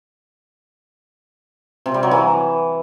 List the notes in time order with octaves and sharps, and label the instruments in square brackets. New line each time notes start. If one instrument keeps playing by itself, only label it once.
[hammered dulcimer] C3
G3
F#3
E3